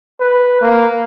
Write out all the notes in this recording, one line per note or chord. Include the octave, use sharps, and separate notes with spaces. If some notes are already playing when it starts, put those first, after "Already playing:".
B4
A#3